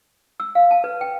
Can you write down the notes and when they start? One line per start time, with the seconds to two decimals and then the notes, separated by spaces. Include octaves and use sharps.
0.40 E6
0.55 F5
0.71 A5
0.84 B4
1.01 G5